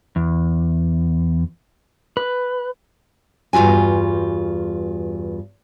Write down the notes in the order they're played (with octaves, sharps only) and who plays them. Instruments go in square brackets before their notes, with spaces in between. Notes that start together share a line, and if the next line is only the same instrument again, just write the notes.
[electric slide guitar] E2
B4
[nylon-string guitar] E2 G2 F4 F#4 G#5